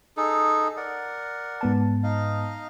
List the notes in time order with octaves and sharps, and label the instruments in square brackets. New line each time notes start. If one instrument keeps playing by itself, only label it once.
[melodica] D#4 G#4 A4
A#4 D5 F#5
[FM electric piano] G#2 B3 A5
[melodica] D#4 D#5 F5